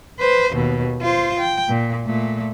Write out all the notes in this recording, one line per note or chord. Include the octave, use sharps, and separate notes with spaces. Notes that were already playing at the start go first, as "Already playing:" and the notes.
B4 C5
D#2 B2
F4 C5
G5
A#2
A#2 A3